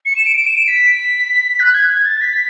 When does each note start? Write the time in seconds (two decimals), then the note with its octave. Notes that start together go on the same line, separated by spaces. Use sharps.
0.06 C#7
0.16 E7
0.26 D7
0.37 D7
0.47 E7
0.57 D7
0.68 B6
1.60 F#6
1.74 G#6
1.91 G#6
2.06 A6
2.21 B6